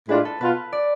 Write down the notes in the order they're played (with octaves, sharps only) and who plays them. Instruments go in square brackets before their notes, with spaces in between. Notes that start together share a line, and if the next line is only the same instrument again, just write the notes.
[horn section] A2 G#3 D4 F4 [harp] B4
[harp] A4
[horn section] B2 B3 F4 [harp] B4
[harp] D5